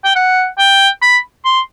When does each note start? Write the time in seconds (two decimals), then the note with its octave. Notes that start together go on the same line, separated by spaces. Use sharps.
0.05 G5
0.16 F#5
0.59 G5
1.02 B5
1.45 C6